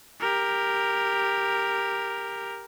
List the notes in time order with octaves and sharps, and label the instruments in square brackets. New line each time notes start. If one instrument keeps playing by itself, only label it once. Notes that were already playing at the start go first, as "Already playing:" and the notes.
[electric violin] G4 A#4